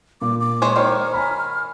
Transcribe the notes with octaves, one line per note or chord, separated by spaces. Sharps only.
A#2 D6
D6
G#3 C5 C#5
D#3 C5 C#5 C6 F6
G#5 A#5 B5